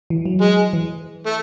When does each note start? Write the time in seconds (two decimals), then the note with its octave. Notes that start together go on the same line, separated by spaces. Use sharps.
0.10 E3
0.25 F#3
0.42 G#3
0.73 E3
1.27 A3